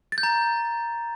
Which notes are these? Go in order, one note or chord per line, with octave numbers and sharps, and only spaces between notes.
A6
G6
A#5